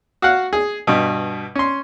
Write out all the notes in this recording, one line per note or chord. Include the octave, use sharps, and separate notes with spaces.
F#4 F5 F#5
G#4
G2 B2
C#4 C6